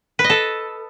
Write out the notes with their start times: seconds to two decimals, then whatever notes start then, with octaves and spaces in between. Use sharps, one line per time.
0.19 B4
0.24 D#5
0.30 A4